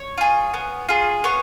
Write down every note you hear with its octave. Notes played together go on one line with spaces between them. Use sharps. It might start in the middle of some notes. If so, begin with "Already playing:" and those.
Already playing: C#5 C#6
F4 G#4
B3
F4 G#4
B3 C#5 C#6